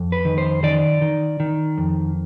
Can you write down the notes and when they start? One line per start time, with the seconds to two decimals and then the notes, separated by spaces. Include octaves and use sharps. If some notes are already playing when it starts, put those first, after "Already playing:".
Already playing: F2
0.12 B4
0.25 D#3
0.38 C5
0.63 D#3 D5
1.02 D#3
1.40 D#3
1.78 F2